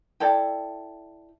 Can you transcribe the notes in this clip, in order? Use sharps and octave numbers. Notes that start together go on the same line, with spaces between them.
E4 A4 D5 G5